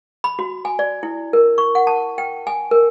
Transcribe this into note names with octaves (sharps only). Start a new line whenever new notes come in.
B5
F#4
G#5
D5
E4
A#4
C#6
F#5
A5
G5
G#5
A#4